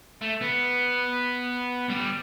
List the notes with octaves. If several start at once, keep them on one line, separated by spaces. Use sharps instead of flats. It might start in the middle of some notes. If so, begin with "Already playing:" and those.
A3
B3
G3 B3